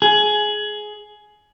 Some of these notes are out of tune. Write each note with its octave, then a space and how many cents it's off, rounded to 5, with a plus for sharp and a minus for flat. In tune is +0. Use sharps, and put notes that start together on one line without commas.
G#4 +20